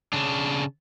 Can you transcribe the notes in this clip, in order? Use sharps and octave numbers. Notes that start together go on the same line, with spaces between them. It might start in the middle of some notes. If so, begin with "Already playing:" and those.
C#3 D4